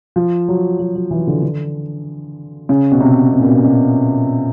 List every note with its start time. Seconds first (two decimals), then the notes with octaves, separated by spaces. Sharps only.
0.16 F3
0.48 F#3
0.79 F#3
0.95 F#3
1.11 E3
1.27 D3
1.43 D3
2.69 C#3
2.92 B2
3.00 C3
3.32 B2
3.40 A#2
3.49 B2
3.64 B2